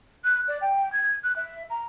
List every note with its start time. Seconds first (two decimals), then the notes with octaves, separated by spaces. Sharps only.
0.24 F#6
0.47 D5
0.61 G5
0.92 G#6
1.23 F#6
1.36 E5
1.69 A#5